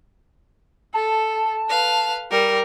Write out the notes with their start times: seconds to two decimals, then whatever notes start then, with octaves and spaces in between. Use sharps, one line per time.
0.94 A4 A5
1.70 B4 F5
2.31 G3 A#4